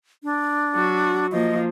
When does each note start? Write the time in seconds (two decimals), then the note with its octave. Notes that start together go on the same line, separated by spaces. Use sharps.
0.23 D4
0.75 F#3 F#4
1.32 F3 A#3 D#5